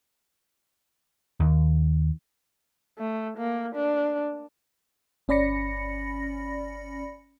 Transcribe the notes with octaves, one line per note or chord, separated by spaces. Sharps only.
D#2
A3
A#3
D4
G1 C#4 D5 B5 A#6 C#7